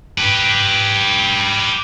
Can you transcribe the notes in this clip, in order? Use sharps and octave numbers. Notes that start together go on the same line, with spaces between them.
G4 B4